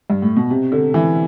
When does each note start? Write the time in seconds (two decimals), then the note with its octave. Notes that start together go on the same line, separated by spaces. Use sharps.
0.10 G2
0.22 A2
0.36 B2
0.50 C3
0.72 D3
0.94 E3